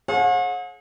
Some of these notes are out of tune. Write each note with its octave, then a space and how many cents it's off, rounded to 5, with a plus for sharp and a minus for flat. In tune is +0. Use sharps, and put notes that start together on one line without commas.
G#4 +35 C#5 -40 F#5 -40